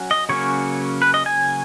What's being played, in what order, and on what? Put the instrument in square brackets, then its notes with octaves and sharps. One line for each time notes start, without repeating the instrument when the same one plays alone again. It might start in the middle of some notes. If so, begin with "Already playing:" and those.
Already playing: [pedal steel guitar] F#3 C#4
D#5
C#3 F#3 A#3 C#4 C#5
B4
D#5
G#5